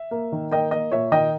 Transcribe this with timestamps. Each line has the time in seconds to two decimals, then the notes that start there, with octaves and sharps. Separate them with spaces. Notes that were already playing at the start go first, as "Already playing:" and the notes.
Already playing: E5
0.11 A#3
0.32 D#3
0.51 A#3 D#5 G5
0.71 A#3 D#5
0.91 A#2 C#5 E5
1.12 D#3 D#5 G5